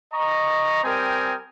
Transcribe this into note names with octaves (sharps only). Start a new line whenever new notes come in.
D#5 A#5 C#6
G3 C4 A#4 G5 G#5 D#6